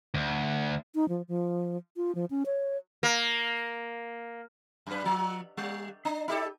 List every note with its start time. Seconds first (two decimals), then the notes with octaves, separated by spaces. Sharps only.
0.14 D2
0.95 D#4
1.09 F3
1.28 F3
1.97 F4
2.15 F3
2.31 C#4
2.46 C#5
3.03 A#3
4.86 F#2 B4
5.05 F3
5.57 G3
6.05 D4
6.28 D#4 G4 A4